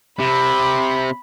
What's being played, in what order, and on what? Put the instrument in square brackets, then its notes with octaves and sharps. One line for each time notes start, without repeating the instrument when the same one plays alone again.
[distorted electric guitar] C3 [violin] B5